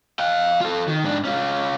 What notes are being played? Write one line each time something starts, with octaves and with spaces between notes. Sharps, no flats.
F5 G5
F4 A4
D#3
G#2 D4
C#4 F4